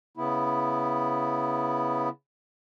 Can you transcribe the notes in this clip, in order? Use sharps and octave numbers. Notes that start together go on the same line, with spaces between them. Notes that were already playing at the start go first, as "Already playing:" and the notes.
C#3 B3 E4